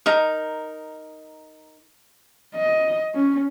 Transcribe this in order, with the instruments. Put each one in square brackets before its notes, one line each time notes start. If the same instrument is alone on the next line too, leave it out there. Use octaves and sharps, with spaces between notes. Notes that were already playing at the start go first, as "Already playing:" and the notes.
[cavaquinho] D#4 A#4
[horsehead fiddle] D#5
C#4